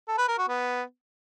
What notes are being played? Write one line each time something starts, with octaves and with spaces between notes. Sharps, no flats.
A4
B4
A#4
F#4
B3